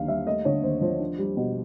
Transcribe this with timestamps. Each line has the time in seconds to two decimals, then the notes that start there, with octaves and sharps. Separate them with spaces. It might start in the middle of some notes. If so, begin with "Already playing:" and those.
Already playing: D#2 D3 F#3 A#3 F5
0.08 G3 E5
0.26 A3 D#5
0.45 D3 C#5
0.63 D#2 C5
0.81 F3 C5
1.00 D4
1.18 G3
1.37 B2